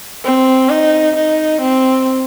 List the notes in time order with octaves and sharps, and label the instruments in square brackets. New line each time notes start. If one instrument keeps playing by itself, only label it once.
[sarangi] C4
D#4
D#4
C4